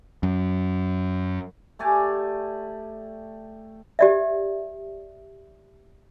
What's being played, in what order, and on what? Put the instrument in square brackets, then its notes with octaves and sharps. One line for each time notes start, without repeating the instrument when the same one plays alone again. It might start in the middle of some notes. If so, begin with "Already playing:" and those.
[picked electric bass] F#2
[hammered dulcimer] A3 G4 D5 G#5
[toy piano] G4 D5 E5